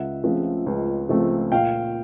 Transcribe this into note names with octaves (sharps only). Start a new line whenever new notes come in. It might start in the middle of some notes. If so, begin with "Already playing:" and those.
Already playing: C#2 E5 F#5
C#3 F3 A3 C4
C#2
C#3 F3 A3 C4
A#2 F5 G5